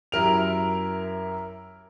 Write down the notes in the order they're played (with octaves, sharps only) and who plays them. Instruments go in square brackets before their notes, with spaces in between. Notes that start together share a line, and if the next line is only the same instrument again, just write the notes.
[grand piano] F#2 E4 G4 A#4 D7 F7